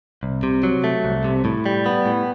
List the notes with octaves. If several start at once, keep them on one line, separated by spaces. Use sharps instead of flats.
C2
C3
F#3
A3
C2
C3
A2
G3
B3
A2